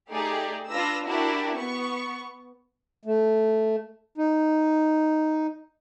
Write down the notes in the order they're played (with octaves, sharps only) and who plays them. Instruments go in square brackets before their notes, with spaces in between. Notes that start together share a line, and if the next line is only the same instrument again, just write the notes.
[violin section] A3 D#4 G4 G#4 D5
D4 F4 B4 E6 A#6
D4 E4 F#4 G4 A#4
B3 C#6
[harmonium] A3
D#4